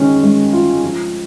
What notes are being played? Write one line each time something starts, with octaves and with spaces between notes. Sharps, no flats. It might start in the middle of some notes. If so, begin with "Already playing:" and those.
Already playing: D#3 G#3 C#4
G#3
F4
F3